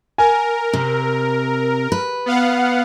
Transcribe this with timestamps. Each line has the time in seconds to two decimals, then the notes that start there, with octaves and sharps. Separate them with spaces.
0.18 A#4 G#5
0.73 C3
1.92 B4
2.26 B3 F5 F#5